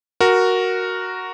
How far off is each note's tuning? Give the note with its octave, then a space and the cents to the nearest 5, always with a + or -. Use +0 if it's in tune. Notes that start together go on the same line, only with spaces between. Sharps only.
F#4 +0 A#4 +0